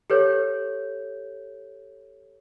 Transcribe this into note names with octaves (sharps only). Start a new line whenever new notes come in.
G4 A4 B4 C#5 G6